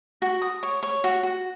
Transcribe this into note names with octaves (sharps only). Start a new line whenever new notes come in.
F#4
D#6
C#5
C#5
F#4
F#4